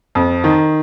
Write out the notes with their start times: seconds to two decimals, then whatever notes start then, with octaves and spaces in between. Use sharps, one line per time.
0.15 F2
0.44 D#3